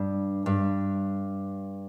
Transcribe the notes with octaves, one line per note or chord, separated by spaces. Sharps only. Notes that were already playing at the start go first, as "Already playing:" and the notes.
Already playing: G2
G2